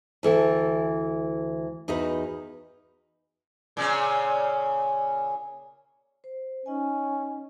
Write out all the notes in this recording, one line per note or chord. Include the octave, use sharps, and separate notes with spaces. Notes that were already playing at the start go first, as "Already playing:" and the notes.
D2 E3 A4 G5
E2 D#4 F#4 B4
A#2 C#3 C#4
C5
C#4 D#4 D#5 G#5